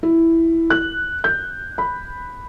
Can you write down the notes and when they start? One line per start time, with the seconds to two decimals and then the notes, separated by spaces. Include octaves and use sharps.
0.03 E4
0.70 F#6
1.24 G6
1.78 B5